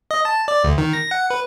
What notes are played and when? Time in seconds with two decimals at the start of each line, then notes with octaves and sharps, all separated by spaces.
0.11 D#5
0.25 A5
0.48 D5
0.64 D2
0.78 D#3
0.93 A#6
1.11 F#5
1.30 B4